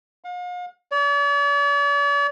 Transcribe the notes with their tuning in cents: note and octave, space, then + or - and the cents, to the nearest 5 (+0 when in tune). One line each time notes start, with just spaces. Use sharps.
F5 +45
D5 -45